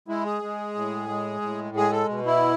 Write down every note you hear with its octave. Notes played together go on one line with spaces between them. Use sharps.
G#3 E4
G#4
G#3
A2
G#3
A2
G#3 G#4
A4
B2
E4